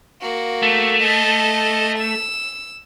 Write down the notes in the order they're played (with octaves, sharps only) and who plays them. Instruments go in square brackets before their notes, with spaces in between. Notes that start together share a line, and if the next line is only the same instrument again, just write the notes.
[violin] A#3 F#4
[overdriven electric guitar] A3
[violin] A4 D#5
E6